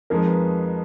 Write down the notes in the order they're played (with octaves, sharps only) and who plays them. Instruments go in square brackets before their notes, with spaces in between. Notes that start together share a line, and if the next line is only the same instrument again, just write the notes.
[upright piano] F2 F3 G#3 D#4 [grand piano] A#4
[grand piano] B4